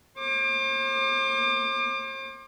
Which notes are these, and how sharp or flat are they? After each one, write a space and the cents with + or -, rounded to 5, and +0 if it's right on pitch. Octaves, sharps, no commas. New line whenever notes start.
C5 +40 D6 +30